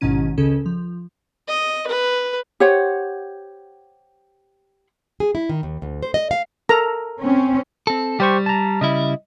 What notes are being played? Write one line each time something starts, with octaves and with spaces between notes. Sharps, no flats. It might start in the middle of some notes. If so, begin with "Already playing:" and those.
A1 G#2 B2 D#3 C#4 D#7
C#2 C#3 C#4 A4
F3
D#5
B4
G4 C5 C#5 F#5
G#4
E4
D#3
D#2
D2
C5
D#5
F5
A4 A#4 A#5
C4 C#4
C4 A4
G3 G4 C5 C#6
A5 A#5
C#3 G3 E4 D#5